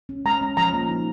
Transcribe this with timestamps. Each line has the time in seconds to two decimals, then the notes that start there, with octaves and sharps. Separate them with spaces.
0.09 C#4
0.25 G#3 A#5
0.41 C#4
0.57 F3 A#5
0.73 A#3
0.89 D#4